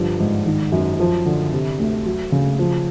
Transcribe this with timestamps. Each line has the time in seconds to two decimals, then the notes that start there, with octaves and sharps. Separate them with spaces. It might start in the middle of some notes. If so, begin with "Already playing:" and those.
Already playing: G2 D3 F3
0.20 G#2
0.46 D#3
0.72 F#2
1.00 F3
1.26 D3
1.52 C3
1.79 D2
2.06 F#3
2.32 C#3
2.59 F3